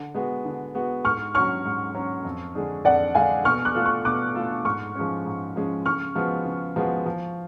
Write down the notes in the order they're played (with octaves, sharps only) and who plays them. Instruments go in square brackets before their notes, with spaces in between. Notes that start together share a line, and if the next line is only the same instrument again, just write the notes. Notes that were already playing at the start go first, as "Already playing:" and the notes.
Already playing: [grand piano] D3
G#3 B3 F#4
D3
G#3 B3 F#4
[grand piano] G#2 [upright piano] C#6 F6
[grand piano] F#3 C#4 F#4 C#5 [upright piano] C#6 F6
[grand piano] G#2
F#3 C#4 F#4 C#5
F2
D3 G#3 D4 G#4
[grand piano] F2 [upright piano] D5 F#5
[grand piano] D3 G#3 D4 G#4 [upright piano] F5 G#5
[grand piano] B2 [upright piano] C#6 F6
[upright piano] D6 F#6
[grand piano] A3 F4 A4
[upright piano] C#6 F6
[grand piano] B2 [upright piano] D6 F#6
[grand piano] A3 F4 A4
[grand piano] G#2 [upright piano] C#6 F6
[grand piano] F3 G#3 C#4
G#2
F3 G#3 C#4
[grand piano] C#3 [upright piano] C#6 F6
[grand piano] F3 G#3 B3 F#4
C#3
F3 G#3 B3 F#4
F3